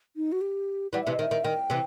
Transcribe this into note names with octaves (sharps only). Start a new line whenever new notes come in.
D#4
F#4
G4
E3 G3 F#5
C3 E3 E5
D#5
D#3
E5
D#3
D#3 G5
C3 E3